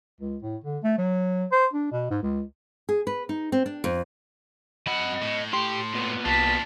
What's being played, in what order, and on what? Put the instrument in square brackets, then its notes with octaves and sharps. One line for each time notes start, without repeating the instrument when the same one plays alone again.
[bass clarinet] C#2
A2
D3
A3
F#3
C5
D4
B2
G#2
C#2
[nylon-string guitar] G#4
B4
D#4
C4
D4
F2
[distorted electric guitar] F#2 F#5 [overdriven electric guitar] D#5 B5
[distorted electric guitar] A2
[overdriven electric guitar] G4 [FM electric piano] C6
[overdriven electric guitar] A#2 B3
[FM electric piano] C2 [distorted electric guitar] D4 F4 [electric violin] A5 B6